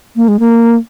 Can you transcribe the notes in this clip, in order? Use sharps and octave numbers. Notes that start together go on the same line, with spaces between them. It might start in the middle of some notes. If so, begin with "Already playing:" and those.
A#3
G#3
A#3